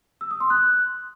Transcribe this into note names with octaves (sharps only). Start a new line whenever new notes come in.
E6
D#6
C6
F#6